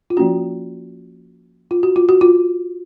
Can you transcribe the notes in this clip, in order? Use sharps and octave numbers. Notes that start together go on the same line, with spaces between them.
F4
F3 A#3 C#4 F#4
F4
F#4
F4
F#4
F4